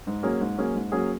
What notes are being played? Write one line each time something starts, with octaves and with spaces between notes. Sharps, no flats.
G#2
F#3 A#3 C#4 G#4
G#2
F#3 A#3 C#4 G#4
G#2
F#3 A#3 C#4 G#4